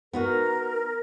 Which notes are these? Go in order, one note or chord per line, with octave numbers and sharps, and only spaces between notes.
B3 D#4 F#4 A#4